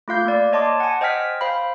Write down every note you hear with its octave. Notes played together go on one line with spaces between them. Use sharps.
A3 F4 F5 G6
A#3 D5
C#5 D#5 A5 C6 D6
F#5 G#5
C5 D#5 G5 G#5 F6 B6
C5 F5 B5